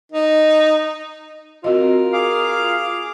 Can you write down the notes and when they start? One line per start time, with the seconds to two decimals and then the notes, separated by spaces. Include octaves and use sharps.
0.12 D#4
1.64 C4 F4 F#4 A#4 D#5
2.13 G#4 F5 D6